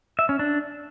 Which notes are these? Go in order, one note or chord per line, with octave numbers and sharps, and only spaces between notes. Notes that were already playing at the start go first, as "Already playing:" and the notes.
E5
C#4
D4